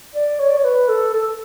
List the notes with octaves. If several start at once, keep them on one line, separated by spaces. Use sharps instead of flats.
D5
C#5
D5
C#5
B4
A4
A4